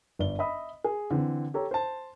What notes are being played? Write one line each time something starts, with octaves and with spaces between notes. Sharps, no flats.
G1 D5 G7
D#5 E5 B5 D#6
G#4
D3 E3 C4
G4 A4 C#5 A#5
C5 A5